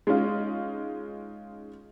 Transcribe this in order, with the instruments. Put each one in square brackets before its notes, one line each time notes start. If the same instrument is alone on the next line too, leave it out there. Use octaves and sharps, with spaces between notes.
[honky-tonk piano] G#3 C#4 D#4 F4